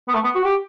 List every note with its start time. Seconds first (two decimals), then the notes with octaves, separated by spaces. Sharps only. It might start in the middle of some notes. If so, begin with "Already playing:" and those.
0.08 B3
0.14 A3
0.24 B3
0.35 F#4
0.45 G4